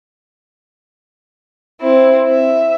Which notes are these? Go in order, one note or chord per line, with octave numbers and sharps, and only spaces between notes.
C4 E4
E5